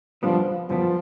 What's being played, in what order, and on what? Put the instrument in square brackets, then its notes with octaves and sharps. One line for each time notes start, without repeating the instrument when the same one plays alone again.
[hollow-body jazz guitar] F#2 D3 G3 B3 D4 [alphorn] F3
[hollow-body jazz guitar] F#2 D3 G3 B3 D4 [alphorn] F3